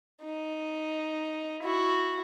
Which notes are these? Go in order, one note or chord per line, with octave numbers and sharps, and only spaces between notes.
D#4
E4 F#4